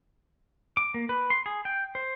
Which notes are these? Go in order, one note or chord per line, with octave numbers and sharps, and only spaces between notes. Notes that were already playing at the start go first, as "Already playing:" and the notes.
D6
A#3
B4
C6
G#4
G5
C5